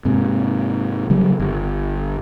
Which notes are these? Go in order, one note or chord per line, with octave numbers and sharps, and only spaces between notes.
G#2 C3
C#3 F#3 G3
G1